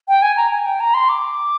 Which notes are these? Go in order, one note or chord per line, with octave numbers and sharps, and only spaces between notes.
G5
G#5
A#5
G#5
G5
A#5
C6
D6